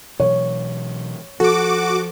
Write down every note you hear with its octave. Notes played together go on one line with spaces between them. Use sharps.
B2 E3 F#3 C#5
F3 F#4 A4 D6